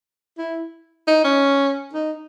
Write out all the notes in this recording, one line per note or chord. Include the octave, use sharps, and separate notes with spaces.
E4
D#4
C#4
D#4